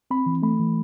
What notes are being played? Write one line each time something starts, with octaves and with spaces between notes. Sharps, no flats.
C4 B5
E3
A3 B5
E3